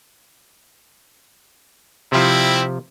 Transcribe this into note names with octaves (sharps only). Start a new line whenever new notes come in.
C3 F3 G3 C4 E4